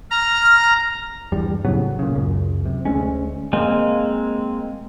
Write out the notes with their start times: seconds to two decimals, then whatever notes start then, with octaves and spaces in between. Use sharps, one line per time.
0.11 A#5 F6
1.32 E2 G2 G3
1.65 A2 C#3 F#3 B3
1.99 A#2 C#3
2.15 C#2 F#2
2.66 C3
2.85 D2 G#3 C#4
3.53 G#3 A#3 C4